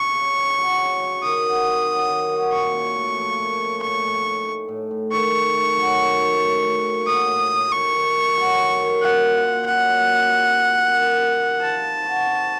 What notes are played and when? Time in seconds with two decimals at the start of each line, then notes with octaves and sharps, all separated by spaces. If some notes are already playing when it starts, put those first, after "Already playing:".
Already playing: C#6
0.15 C#3
0.36 C4
0.58 F#3
0.80 C#3
1.02 C#3
1.23 D#3 D#6
1.45 F#4
1.67 C4
1.87 F#3
2.09 D#3
2.32 F#4
2.53 A#2 C#6
2.75 C#4
2.96 A3
3.18 F3
3.40 A#2
3.61 C#4
3.83 A2 C#6
4.04 A2
4.26 D#4
4.47 A3
4.68 A2
4.91 A2
5.12 D#3 C#6
5.34 D#3
5.56 A3
5.77 F#3
5.99 D#3
6.21 D#3
6.42 A2
6.63 A2
6.85 A#3
7.07 F#3 D#6
7.29 A2
7.51 A2
7.72 D#3 C#6
7.93 D#3
8.15 A3
8.36 F#3
8.59 D#3
8.81 D#3
9.02 A#2 F#5
9.24 F4
9.45 A#3
9.67 F#3 F#5
9.88 A#2
10.10 F4
10.32 C3
10.54 D#4
10.75 A#3
10.97 D#3
11.18 C3
11.40 D#4
11.61 F3 A5
11.83 F3
12.05 F#4
12.26 C4